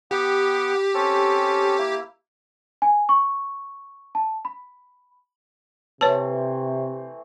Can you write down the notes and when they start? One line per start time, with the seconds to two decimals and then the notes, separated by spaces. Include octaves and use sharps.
0.11 B3 G4 F#5 G5
0.94 C4 C#4 A4
1.78 A#3 E4
2.82 G#5
3.09 C#6
4.15 A5
4.45 B5
6.01 C3 E3 A3 C4 B4 C#5 A5